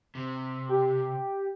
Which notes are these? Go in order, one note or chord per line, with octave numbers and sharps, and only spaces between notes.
C3
G4